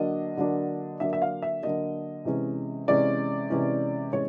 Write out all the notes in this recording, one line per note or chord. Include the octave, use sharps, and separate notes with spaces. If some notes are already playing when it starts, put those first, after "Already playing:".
Already playing: D3 F#3 A#3 D4 D#5
D3 F#3 A#3 D4
D3 F#3 A#3 D4 E5
E5
F5
E5
D3 F#3 A#3 D4 D#5
C3 E3 G#3 C#4
C3 E3 G#3 C#4 D5
C3 E3 G#3 C#4
C3 E3 G#3 C#4 C#5